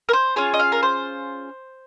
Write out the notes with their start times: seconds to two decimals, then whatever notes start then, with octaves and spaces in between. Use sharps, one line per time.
0.09 A#4
0.13 C5
0.36 C#4 F4 G#4 C#5
0.54 D#5
0.60 F5
0.72 A#4
0.83 C5